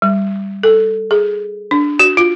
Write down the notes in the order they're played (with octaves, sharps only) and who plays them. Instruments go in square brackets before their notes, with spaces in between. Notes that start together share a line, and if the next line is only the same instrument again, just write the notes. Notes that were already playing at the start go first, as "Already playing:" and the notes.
[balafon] G3
A4
G#4
D4
F#4
F4